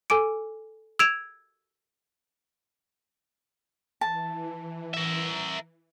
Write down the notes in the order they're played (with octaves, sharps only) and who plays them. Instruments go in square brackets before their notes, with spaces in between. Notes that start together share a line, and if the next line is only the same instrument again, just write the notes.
[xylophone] A4 G#5 D6 D7
E6 G#6 D7 E7 F7
[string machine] E3 [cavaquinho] A5
[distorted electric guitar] A#4 E5